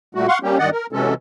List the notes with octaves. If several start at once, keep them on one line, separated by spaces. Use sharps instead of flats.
A#2 G3 A3 F#4
F5 F#5 C6 C#6
G3 A#3 C#4 G4
G2 D#3 D5 D#5 F#5
A#4
C3 E3 F#3 G#3 C#4 A4